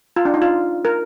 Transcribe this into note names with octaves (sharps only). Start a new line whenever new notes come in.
F4
D4
D#4
F4
A#4